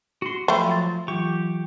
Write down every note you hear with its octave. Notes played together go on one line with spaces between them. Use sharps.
F#4 C6
F3 F#3 A3 C5 G5 B5
C6 A6
E3 F#3 F4 G4 C#6